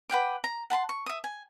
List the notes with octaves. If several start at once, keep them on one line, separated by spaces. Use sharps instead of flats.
B4 F#5 G5 D6
A#5
F#5 A5 B5 C6
C#6
E5 D#6
G#5